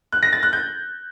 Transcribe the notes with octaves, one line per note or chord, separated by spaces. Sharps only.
F#6
A#6
A6
F#6
G6